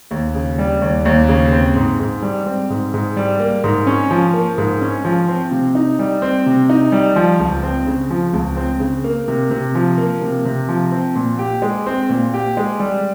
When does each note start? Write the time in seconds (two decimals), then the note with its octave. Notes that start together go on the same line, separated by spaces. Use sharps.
0.11 D#2
0.35 C#3
0.58 G3
0.82 D#2
1.05 D#2
1.29 C#3
1.52 C4
1.76 G#2
2.00 G#2
2.22 G3
2.46 C4
2.70 G#2
2.94 G#2
3.17 G3
3.40 A#3
3.64 G#2
3.87 C#4
4.11 F3
4.34 A#3
4.58 G#2
4.81 C#4
5.05 F3
5.28 C4
5.52 C3
5.75 D#4
5.99 G3
6.22 C4
6.46 C3
6.69 D#4
6.92 G3
7.16 F3
7.39 C#2
7.63 C4
7.87 C#3
8.10 F3
8.34 C#2
8.57 C4
8.80 C#3
9.04 A#3
9.28 C3
9.51 C3
9.75 F3
9.98 A#3
10.21 C3
10.45 C3
10.69 F3
10.92 C4
11.16 A#2
11.39 G4
11.62 G#3
11.86 C4
12.10 A#2
12.34 G4
12.57 G#3
12.80 G3